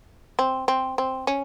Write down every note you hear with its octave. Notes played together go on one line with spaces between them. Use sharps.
C4
C4
C4
C#4